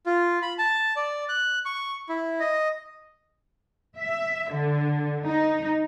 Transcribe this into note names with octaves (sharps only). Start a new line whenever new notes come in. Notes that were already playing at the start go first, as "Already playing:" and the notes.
F4
B5
A5
D5
F#6
C#6
E4
D#5
E5
D3
D#4